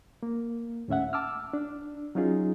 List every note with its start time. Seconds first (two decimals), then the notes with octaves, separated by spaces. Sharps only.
0.23 A#3
0.88 D#2 A2 C#4 E5 F#5
1.13 A5 D6 E6 F6
1.53 D4
2.15 F#3 C#4 D#4 F4 G#4